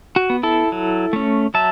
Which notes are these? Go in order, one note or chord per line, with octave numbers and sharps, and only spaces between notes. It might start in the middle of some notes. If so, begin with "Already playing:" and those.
F#4
B3
E4 A4
F#3
A3 C#4
F#3 E5 A5